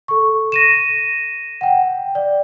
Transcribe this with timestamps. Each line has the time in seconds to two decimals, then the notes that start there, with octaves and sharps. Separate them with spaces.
0.08 A4 C#6
0.52 A#6 D#7 E7
1.61 F#5 G5
2.15 D5